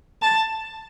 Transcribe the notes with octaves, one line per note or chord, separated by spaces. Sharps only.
A5